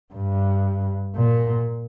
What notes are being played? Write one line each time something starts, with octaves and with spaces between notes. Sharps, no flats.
G2
A#2